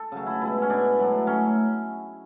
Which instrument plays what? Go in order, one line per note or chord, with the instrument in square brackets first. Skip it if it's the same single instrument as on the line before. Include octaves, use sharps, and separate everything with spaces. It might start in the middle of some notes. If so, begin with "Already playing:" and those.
Already playing: [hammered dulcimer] A4
C#3 F#3 A3
E4
B2 G#3 E4
C#4
B2 G#3 D4
A2 F#3 A3
A2 F#3 A3 C#4